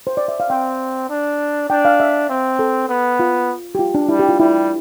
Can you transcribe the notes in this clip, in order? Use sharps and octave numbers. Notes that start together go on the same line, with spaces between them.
C5
D5
E5
F5
C4 G5
D4
D4 G5
F5
E5
C4
A4
B3
F4
G4
F4
D4
G3 E4
G4
F4
G3 E4